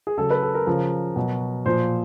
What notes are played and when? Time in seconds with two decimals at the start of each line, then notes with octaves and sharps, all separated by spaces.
0.07 G#4
0.18 C#3 F#3 A4
0.30 B4
0.42 A4
0.54 A#4
0.67 C#3 F3
1.16 B2 F#3
1.65 A#2 F3 C5